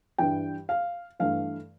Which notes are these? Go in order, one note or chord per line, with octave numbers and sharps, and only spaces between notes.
G2 E3 G3 G5
F5
G2 E3 A3 F5